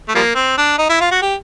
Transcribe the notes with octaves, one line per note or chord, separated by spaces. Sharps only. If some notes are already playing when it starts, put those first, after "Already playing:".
A3
F3 G3 A#3
C4
D4
D#4
E4
F4
F#4
G4